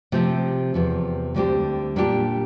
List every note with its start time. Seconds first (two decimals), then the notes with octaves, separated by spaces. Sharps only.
0.12 C3 F3 A3 C4 G4
0.74 E2 C3 F3
1.34 D2 D3 G3 C4 G4
1.96 A#2 G3 D4 G4